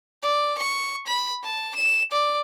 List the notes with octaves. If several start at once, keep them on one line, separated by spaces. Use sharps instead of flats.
D5
C#6
B5
A5
E7
D5